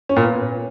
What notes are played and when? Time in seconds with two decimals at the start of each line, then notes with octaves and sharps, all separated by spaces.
0.09 C#4
0.16 A#2
0.23 B3